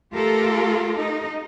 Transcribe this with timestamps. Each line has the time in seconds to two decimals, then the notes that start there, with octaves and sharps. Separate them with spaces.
0.12 A3 F4 G4 A4 A#4
0.98 D#4